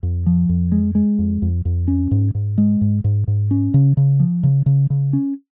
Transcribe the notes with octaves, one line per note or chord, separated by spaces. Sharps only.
F2
F3
F2
G#3
G#3
F2
F2
F2
C#4
G#2
G#2
G#3
G#2
G#2
G#2
C#4
C#3
C#3
F3
C#3
C#3
C#3
C#4